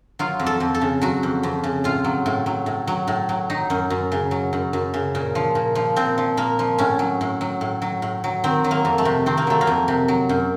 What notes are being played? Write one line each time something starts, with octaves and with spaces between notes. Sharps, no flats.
F#3 F4
F2
A4
F2
A4
C#3
F#3 F#4
F2
F2
C#3
A2 F4
F#3
A2
F#3
A2
F#3
A2
F#3
F#3 D#4
F#2
F#2
C#3
F#3
F#2
F#2
C#3
A#2
F3
A#2
F3
A#2 C4
F3
A#2 A#3
F3
A2 C#4
F#3
A2
F#3
A2
F#3
A2
F#3
D#3 C4
F#3
A#3
F2
A3
C3
D#3 C4
A#3
F#3 A3
A#3
F2
C3
F#3
F#2